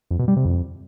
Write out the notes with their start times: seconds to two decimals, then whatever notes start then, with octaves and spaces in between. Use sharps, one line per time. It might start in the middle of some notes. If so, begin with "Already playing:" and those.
0.11 F2
0.19 B2
0.28 G3
0.36 C3
0.45 F2